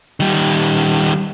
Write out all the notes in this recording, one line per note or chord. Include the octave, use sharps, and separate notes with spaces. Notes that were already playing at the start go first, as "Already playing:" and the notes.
D#3 G3